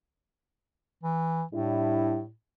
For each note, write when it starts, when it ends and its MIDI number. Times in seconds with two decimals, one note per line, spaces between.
1.03 1.43 52
1.53 2.31 45
1.53 2.19 55
1.53 2.19 62
1.53 2.19 64